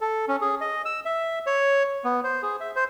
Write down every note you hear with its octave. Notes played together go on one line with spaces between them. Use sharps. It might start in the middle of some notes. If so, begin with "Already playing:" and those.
A4
C#4
G#4
D#5
E6
E5
C#5
B3
C5
G#4
E5
C5